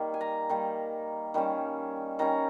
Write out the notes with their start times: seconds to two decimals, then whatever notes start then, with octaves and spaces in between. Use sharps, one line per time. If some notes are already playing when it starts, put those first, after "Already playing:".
Already playing: D#3 G3 A#3
0.14 G#5
0.21 A#5
0.49 D#3 G3 A#3
1.34 D#3 G3 C#4
2.19 D#3 G3 C#4 A#5